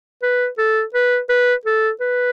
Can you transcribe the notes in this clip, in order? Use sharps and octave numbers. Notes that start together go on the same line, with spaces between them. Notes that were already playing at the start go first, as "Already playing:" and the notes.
B4
A4
B4
B4
A4
B4